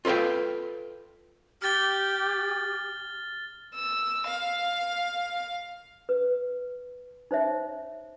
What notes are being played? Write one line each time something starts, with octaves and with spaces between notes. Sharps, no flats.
F4 A4 B4 F5 G5
G4 F6 A6 G7
E6
F5
B4
D#4 C5 C#5 E5